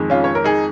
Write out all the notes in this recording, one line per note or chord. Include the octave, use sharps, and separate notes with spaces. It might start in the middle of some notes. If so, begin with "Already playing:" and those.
Already playing: F2 D#3 G#3
C#4 F4
C#5
A#4
D#4 G#4